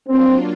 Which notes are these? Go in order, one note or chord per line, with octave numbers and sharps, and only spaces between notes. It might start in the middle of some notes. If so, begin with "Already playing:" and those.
F#3 A#3 C4 D4 F4